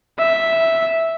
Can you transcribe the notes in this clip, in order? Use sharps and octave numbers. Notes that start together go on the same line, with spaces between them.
E5